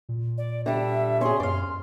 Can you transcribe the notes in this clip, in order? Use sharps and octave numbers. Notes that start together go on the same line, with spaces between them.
A#2
D5
D3 G3 E5
C#4 G#4 C6
F#2 D5 F5